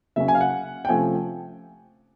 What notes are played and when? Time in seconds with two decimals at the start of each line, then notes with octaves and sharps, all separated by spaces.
0.16 C#3 F#3 A#3 C#4 E5
0.28 G#5
0.35 F5
0.41 F#5
0.85 G5
0.89 C3 F3 A3 C#4 G#5